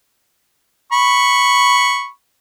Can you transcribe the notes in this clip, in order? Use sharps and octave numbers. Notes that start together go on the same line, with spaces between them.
B5 C#6